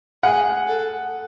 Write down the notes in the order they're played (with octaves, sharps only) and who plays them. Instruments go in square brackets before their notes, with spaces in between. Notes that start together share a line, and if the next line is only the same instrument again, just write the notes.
[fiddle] G#4 [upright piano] F#5
[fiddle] A4